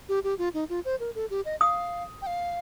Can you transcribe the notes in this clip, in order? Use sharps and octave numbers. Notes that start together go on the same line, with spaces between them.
G4
G4
F4
D#4
F4
C5
A#4
A4
G4
D#5
F5 D#6
G5
F5